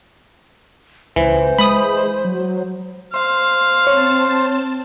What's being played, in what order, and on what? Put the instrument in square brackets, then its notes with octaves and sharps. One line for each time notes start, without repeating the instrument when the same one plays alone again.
[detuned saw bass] C#2 [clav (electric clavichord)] E3 [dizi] C5
[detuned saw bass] G#3 [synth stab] B5 D#6
[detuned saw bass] F#3
[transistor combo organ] C5 [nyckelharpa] F5
[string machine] C4 A5 [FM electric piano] C#5